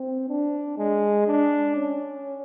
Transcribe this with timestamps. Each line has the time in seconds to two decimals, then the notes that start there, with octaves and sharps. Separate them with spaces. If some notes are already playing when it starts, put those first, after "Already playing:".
Already playing: C4
0.29 D4
0.78 G#3
1.27 D4
1.76 C#4